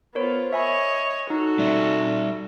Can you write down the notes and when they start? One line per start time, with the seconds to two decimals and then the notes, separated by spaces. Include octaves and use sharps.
0.15 B3 F4 A#4 C5 C#5
0.53 C#5 D#5 E5 G#5 B5
1.30 D#4 F#4 A4
1.59 G3 D5 E5